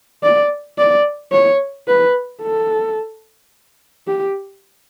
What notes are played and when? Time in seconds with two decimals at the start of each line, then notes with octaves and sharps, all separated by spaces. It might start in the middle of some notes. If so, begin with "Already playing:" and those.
0.23 D5
0.78 D5
1.32 C#5
1.88 B4
2.43 A4
4.07 G4